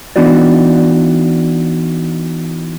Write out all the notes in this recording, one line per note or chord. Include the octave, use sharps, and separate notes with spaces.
E3 B3 D4 D#4 F#4 D5